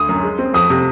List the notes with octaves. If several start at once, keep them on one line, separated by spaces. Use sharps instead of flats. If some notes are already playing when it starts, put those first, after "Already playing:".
Already playing: D2 D#6
F#2
G#3
C4
F2 D#6
C3